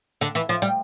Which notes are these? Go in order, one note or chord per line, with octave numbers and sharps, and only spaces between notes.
D3
E3
F3
G3